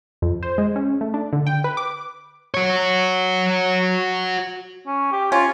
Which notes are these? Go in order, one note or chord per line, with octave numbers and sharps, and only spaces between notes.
F2
C5
G#3
C#4
A3
D4
D3
G5
B4
D6
F#4 C#5
C#4
G4
C#4 F4